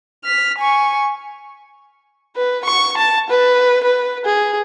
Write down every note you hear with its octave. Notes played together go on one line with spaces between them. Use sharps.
F6 B6
G#5 C#6
B4
C#6
A5
B4
B4
G#4